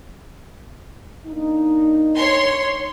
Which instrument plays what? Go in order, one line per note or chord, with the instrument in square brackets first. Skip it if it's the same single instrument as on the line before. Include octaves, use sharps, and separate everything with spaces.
[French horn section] A#3 D4 D#4
[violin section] C#5 C6